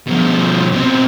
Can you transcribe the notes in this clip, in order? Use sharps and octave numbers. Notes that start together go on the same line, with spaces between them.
B2 F3
B2 C4